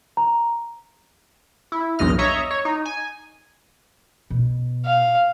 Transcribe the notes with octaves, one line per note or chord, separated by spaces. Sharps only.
A#5
E4
B1 E2 G2 D#5 F6
C#5 D#5 E5 A#5
C#5
D#4
G#5
B2
F5